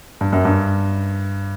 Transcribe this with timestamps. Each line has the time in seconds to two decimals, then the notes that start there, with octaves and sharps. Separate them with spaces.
0.21 G2
0.33 F#2
0.45 G2